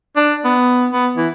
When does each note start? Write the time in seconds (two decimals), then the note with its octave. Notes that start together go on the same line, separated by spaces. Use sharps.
0.16 D4
0.45 B3
0.92 B3
1.17 E3